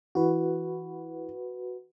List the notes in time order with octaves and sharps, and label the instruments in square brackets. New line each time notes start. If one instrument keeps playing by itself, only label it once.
[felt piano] E3 [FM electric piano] F#4 B4